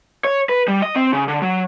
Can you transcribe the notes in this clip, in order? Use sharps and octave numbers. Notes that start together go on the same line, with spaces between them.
C#5
B4
G3
D#5
C4
C#3
D3
F#3